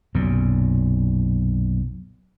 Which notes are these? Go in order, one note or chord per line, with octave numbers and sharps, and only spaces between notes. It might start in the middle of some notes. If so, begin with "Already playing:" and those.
B1 F#2 A#2